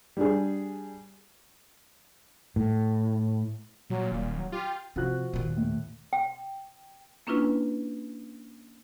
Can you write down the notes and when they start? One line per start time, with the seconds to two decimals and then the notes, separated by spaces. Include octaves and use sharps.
0.17 G3 D4 G#4
2.56 A2
3.90 A#2 F#3
4.12 D#1 A#2
4.36 F#3
4.52 F4 G4
4.96 C3 F3 F#4 F#6
5.33 D#2 A#2
5.57 A2
6.13 G5
7.27 A#3 C#4 D4 E4 F4 B4